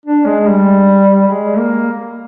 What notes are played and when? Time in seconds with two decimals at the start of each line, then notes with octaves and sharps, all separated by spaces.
0.06 D4
0.26 G#3
0.47 G3
1.28 G#3
1.58 A#3